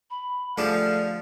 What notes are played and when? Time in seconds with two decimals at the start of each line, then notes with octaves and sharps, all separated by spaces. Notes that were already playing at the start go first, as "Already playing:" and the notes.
0.10 B5
0.58 D3 F3 A3 G4 G#4 D5 F5 E7